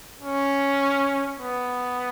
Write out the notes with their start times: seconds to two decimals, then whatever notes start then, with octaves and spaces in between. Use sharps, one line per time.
0.20 C#4
1.40 B3